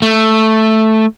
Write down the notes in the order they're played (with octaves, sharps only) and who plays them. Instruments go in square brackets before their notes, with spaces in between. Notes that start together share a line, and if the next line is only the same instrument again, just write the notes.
[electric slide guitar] A3